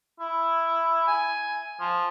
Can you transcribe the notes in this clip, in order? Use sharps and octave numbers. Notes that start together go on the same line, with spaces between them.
E4
G#5
F3